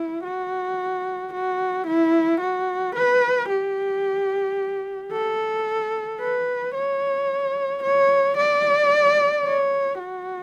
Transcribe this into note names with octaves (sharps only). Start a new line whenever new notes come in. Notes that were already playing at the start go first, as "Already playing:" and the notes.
Already playing: E4
F#4
F#4
E4
F#4
B4
G4
A4
B4
C#5
C#5
D5
C#5
F#4